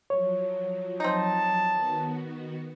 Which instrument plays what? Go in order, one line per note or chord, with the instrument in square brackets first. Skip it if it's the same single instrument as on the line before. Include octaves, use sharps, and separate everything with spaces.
[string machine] F3 F#3 [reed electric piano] C#5
[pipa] C4 D#4 [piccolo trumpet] A5
[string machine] D#3 B3 F#4